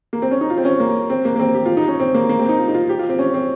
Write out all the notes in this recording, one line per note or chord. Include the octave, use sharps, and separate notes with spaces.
A#3
C4
C#4
D#4
F4
C4
C#4
A#3
C4
A#3
A#3
C4
G4
F4
D#4
C#4
C4
A#3
A#3
C4
D#4
F4
D#4
F4
G4
F4
C4
C#4
C4